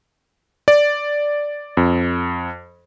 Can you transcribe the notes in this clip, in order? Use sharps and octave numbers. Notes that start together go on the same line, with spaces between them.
D5
F2